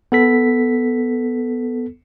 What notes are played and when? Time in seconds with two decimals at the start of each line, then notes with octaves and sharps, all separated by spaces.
0.12 B3 A4 B6